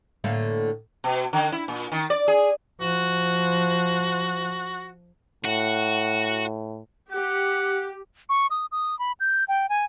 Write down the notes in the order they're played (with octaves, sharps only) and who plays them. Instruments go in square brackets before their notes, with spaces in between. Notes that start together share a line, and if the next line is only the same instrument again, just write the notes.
[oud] A2 D3 A#3
[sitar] B2
D3
E4
A#2
D#3
D5
G#4
[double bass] F3 [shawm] F#4
[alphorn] A2 [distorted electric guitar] F#4
[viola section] G4 [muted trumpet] F#5
[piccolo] C#6
D#6
D#6
B5
G6
G5
G#5